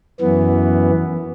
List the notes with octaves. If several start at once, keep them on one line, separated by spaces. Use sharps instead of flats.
F#2 E3 B3